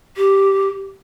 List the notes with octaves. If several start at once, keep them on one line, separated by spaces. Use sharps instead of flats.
G4